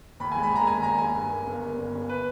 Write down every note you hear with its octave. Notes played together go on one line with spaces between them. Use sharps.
D#2 B5
G#3 G#5
B5
D#2 A#5
D#2 G#5
D#2 A#5
D#2 G#5
G2
A#3
G1
A#3
G1
G1
B4